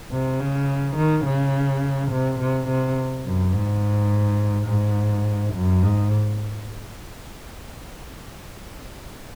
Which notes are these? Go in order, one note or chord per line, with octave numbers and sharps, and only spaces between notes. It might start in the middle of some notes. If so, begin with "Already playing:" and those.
C3
C#3
D#3
C#3
C3
C3
C3
F#2
G#2
G#2
F#2
G#2